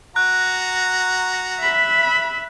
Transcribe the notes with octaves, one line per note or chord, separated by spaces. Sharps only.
F#4 A#5 F#6
E5 B5